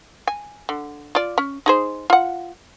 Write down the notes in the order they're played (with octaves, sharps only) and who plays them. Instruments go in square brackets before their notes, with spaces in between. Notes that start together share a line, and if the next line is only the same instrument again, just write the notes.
[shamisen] G#5
D3
F4 D5
C#4
D#4 G#4 C5
F4 F#5